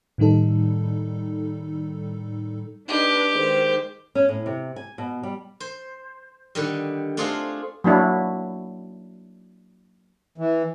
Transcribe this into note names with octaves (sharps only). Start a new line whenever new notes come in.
A2 D#3 G3 D#4 A4
D4 D#4 G4 B4
D#3 G#3 C5
C#4
A2
C3
G#5
B2
G3
C5
D3 D#3 G3
A3 C4 D4 F4 G#4 F5
F#3 A#3 D4 E4
E3